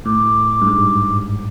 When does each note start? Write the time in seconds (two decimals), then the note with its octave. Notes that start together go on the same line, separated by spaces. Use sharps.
0.05 A2 D6
0.61 G2
0.67 G#2
0.97 G2